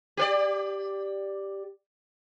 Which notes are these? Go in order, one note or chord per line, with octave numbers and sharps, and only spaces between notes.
G4 B4 D5